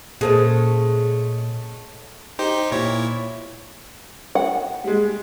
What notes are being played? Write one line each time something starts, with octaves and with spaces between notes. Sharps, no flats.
A#2 G#3 A3 C#4 G#4 A4 C5
D#4 G4 C5
A#2 E4 C#5
F#5
G3 G#3